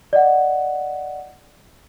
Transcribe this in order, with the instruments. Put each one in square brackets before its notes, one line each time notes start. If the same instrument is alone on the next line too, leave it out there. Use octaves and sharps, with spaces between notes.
[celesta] D5 D#5 F#5